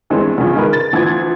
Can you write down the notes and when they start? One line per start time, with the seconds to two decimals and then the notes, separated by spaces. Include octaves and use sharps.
0.10 G2 E3 G#3 C4
0.38 E2 C#3 F3
0.55 D#3 G#3 A#4 B4
0.73 A6
0.93 D2 E3 F3 G#6